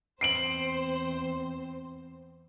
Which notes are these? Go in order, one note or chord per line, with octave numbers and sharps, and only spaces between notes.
E2 C4 C5 C7 D7 F#7